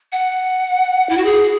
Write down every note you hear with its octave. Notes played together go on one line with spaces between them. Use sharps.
F#5
E4
F#4
G#4